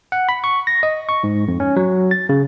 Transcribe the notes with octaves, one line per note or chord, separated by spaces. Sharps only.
F#5
B5
C#6
A#6
D#5
C#6
G#2
F2
C#4
F#3
A6
C#3